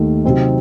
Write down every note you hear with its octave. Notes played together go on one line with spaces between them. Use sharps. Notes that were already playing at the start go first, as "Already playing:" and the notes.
Already playing: D#2 D#3 A3
C3 F#3 C4 D#4